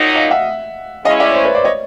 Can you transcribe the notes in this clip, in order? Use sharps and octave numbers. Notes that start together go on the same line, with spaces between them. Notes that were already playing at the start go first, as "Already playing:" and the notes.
Already playing: A#2 F#3 A#3 D#4
D#5 F5
E5 F#5
G#3 C#4 E4 D#5 F5
D5 E5
C#5
C5
B4 C#5
C5 D5
C#5 D#5